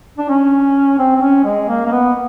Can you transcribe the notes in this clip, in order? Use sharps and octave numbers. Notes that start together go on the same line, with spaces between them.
D4
C#4
C4
C4
C#4
G#3
A#3
A#3
B3